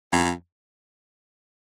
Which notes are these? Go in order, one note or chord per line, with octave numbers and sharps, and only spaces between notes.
F2